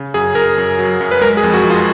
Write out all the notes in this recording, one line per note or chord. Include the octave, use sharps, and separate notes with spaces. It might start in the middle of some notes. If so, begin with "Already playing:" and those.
Already playing: C#3
F#2 G#4
F#2 A#4
F#2
F#3
F#2
B4
G#3 A#4
G#4
F2
F#4
F3
F4